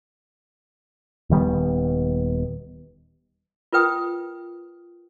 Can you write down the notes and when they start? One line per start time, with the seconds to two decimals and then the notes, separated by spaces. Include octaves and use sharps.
1.30 D#1 D#3 G3 B3
3.73 F4 A#4 B4 G5 D#6